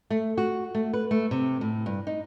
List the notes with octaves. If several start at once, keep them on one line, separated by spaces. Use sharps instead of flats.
A3
F#4
A3
B4
A3
C3
A2
G2
D#4